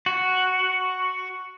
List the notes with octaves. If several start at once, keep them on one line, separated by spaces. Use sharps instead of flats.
F#4